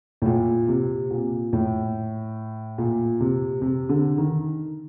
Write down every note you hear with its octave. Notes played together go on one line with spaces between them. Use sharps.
A2
A#2
C3
A#2
A2
A#2
C3
C3
D3
D#3